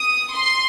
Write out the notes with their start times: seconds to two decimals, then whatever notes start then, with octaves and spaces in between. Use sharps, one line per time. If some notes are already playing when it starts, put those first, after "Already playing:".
Already playing: D#6
0.33 C6